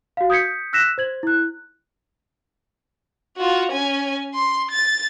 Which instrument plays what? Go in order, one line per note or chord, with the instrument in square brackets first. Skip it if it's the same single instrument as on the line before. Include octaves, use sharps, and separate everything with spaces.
[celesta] F#4 F5
D#6 G6 G#6 B6 C#7
E6 F#6 A#6 B6 E7
C5 G#6 F#7
E4 F#6
[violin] F4 F#4
C#4 G#5
C6
A6